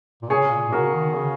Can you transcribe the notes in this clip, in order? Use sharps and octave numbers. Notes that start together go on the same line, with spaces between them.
A#2
C#3 G#4 C#5
A#2
A#2
C#3 F#4 A#4
D#3
C#3